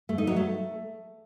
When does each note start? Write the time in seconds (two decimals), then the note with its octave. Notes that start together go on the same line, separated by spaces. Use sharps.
0.09 A3
0.18 D#4
0.27 F#3
0.36 A3